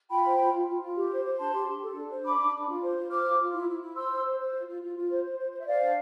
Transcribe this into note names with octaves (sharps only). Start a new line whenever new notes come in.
F4 G5 B5
C5
F4
F4
F4
F4
G4
C5
C5
D4 A5 C6
G4
G4
A4
D4
C5
D4 B5 D6
D4
D4
F4
C5
F4
C5 D6 F6
F4
F4
E4
E4
E4
C5 C6 E6
C5
C5
C5
F4
F4
F4
F4
C5
C5
C5
C5
E5
C5 D5 F5
D4